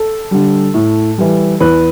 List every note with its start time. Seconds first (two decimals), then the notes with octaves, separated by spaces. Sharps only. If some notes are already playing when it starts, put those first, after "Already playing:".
Already playing: A4
0.31 D3 G3
0.74 A2
1.18 E3 G3
1.60 E2 B4